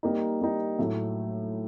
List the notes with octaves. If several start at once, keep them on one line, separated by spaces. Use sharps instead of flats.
G3 A#3 D#4
G3 A#3 D#4
A2 F#3 A3